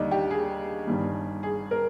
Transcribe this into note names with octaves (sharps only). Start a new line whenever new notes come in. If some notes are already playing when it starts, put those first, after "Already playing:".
Already playing: D#2 D3 G3 D4 D#4
G4
G#4
G1 G2 D#3 G3
G#4
A#4